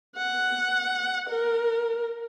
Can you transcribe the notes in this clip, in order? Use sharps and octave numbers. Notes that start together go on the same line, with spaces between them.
F#5
A#4